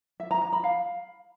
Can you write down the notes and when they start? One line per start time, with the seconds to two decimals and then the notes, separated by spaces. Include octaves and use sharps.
0.20 E5
0.31 A#5
0.42 A#5
0.53 B5
0.64 F5